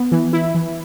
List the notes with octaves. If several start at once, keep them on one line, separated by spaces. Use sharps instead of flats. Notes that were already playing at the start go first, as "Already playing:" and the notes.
Already playing: B3
E3
E4
E3